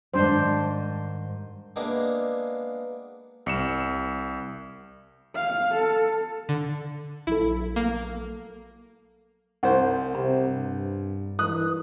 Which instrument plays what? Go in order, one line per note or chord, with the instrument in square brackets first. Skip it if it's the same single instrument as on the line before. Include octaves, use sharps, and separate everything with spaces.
[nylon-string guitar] G#2 D#3 G3 [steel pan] D4 C5
[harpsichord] G#3 A#3 B3 D4 E5
[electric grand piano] C2 C#7 E7
[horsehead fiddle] F5
A4
[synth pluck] D3
[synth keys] A#1 F#3 A4 [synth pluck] E4
[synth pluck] A#3
[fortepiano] C2 C5 [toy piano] F#5
[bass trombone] C3 [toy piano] A#5
[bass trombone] G2
[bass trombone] E3 [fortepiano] D#6 F#6